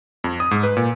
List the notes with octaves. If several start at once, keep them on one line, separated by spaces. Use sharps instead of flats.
F2
D#6
G#2
B4
A#2